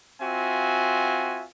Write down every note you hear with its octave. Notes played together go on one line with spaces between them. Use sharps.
C4 F4 F#4 E5 G#5